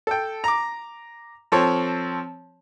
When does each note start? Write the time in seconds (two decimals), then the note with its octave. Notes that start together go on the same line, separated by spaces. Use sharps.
0.07 A4 G5
0.44 A#5 D6
1.52 F3 C4 A4 C#5